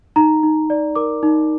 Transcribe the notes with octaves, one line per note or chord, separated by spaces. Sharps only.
D#4 A#5
D#4
D5
A#4 D6
D#4